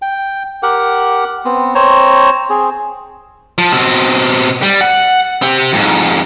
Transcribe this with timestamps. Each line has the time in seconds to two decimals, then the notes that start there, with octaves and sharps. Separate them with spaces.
0.02 G5
0.63 G4 A#4 F#5
1.45 B3 C4
1.75 C4 C5 C#5 A#5
2.50 C4 G#4
3.58 F3
3.72 B2 C4
4.62 G3
4.81 F#5
5.42 C4 G4
5.73 F2 G#2